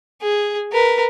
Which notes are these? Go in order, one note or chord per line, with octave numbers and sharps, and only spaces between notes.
G#4
A#4 B4